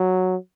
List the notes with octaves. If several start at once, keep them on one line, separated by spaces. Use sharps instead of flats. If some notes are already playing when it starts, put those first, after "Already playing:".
Already playing: F#3